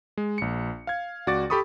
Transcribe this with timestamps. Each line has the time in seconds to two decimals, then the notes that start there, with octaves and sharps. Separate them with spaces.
0.17 G#3
0.38 A#1 C#7
0.87 F5 G#6
1.27 C#2 F#4 D5 D6 A6
1.50 G4 A4 B5 C#6 D#6